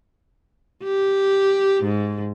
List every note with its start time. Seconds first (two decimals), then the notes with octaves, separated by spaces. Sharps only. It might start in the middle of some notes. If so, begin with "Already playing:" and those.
0.83 G4
1.84 G#2